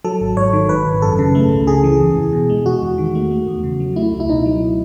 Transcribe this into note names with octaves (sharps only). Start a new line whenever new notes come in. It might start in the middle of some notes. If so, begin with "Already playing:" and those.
F#3 A4
G#1
G#2 C#5
D#3
G#1 B4
G#1
F#2 A4
C#3
A3
C#2
C#3 G#4
E3
E2
E2
B2
G#3
E2 F#4
E2
D#3
A3
A3
E2
C#3
F#3
A3 E4
C#2
E4
B2 D#4
F#3